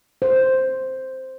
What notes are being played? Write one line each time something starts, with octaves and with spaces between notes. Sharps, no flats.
C5